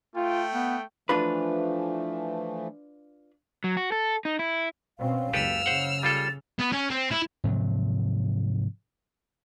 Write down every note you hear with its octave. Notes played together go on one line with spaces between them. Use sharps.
A3 F4 G5
B3
E3 F3 A3 D4 F4 B4
F#3
F#4
A4
D#4
E4
B2 C4 C#4 F5
F#1 C#2 G4 A4 B4 E6 F6
C#3 C5 F#5
G3 F4 A4 A6
B3
C#4
C4
E4
G#2 C3 F3 F#3